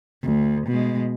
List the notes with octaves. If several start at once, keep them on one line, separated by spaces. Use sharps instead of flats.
D2
B2 G#3